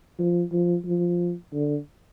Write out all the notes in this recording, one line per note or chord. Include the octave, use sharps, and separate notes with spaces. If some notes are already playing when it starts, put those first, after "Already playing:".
F3
F3
F3
D3